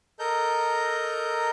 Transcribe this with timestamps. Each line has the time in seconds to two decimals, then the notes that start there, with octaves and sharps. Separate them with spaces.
0.19 A4 A#4 D#5 A#5 G6